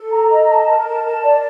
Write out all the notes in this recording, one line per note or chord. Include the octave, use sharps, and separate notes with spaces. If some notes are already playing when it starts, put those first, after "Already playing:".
Already playing: A4
A#5
D#5
A5
A#4
A5
A5
D5